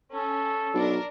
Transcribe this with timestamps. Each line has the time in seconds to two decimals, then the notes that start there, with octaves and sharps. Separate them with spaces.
0.13 C#4 A4
0.74 B1 D4 A#4